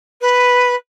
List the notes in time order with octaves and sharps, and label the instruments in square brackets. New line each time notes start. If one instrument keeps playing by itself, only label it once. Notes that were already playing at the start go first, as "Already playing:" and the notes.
[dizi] B4